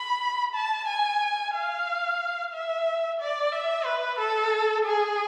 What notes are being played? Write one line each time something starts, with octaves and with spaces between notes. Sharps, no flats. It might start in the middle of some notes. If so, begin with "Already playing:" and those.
Already playing: B5
A5
G#5
F5
E5
D5
E5
B4
A4
G#4